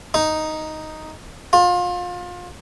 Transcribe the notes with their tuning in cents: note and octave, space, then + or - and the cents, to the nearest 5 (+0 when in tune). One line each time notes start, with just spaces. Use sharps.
D#4 +0
F4 +30